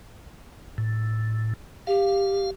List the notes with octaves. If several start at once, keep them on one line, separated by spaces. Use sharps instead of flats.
A2
G4 F5